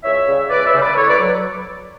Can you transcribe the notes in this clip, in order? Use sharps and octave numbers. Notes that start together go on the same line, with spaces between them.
C#2 C#5 E5
C#3 G3
C#2 B4 D5
C#5 E5
C#3 G3
B4 D5
A2 A4 C#5
B4 D5
F#3